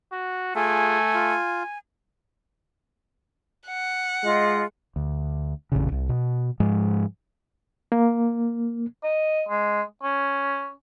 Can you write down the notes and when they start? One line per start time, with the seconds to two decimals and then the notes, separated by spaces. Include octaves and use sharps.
0.12 F#4
0.55 A3 F4 G#4 G#5
1.14 F4
3.68 F#5
4.23 G#3 F4 G#4 D#5
4.96 D2
5.72 A1 F2 A#2 C#3
5.92 C2
6.09 B2
6.60 G#2 F3 G#3
7.92 A#3
9.03 D#5
9.49 G#3
10.03 C#4